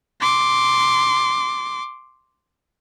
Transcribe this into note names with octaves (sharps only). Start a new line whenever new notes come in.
C6 D6